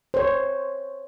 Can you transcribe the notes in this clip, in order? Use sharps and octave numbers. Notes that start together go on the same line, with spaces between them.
C5 C#5